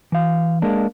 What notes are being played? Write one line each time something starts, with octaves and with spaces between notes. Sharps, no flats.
E3 F5
G#3 A#3 D4